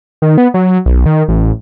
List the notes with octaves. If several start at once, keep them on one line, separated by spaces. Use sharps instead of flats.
D#3
B3
F#3
B1
D#3
A1